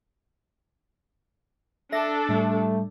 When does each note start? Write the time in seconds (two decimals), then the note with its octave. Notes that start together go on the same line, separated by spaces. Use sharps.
1.92 D4 A4 E5 A#6
2.29 A2 G3 A3